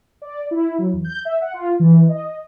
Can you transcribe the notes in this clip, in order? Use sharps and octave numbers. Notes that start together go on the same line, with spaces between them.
D5
E4
F#3
E2
G6
E5
F#5
F4
E3
D#5